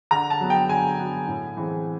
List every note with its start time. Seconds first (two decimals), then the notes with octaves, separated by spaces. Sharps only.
0.11 D3 A#5
0.30 A5
0.41 F#3 B3
0.50 G5
0.69 D3 G#5
0.99 F#3 B3
1.28 A2
1.57 E3 G#3 C4